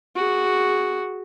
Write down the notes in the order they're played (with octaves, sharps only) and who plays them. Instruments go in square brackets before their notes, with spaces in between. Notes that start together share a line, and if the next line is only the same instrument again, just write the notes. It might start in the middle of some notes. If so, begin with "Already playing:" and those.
[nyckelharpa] F#4 G#4